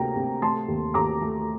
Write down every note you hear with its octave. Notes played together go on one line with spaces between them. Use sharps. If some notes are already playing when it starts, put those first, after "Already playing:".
Already playing: D2 C3 A#3 G5 A#5
C3
A3 A5 C6
D#2
D#2 A#5 D6
A3